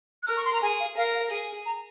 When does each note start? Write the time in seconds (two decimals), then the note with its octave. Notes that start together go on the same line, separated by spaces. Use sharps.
0.23 F#6
0.27 A#4 F6
0.37 C#6
0.45 C6
0.53 A#5
0.62 G#4 G#5
0.80 F5
0.97 A#4 F5
1.15 F5
1.31 G#4
1.66 A#5